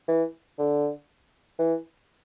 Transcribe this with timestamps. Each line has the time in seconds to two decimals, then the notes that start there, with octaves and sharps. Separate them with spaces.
0.08 E3
0.59 D3
1.59 E3